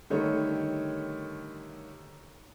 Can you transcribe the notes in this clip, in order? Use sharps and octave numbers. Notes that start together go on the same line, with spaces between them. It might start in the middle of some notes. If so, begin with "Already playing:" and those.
D3 D#3 G3 A3 C#5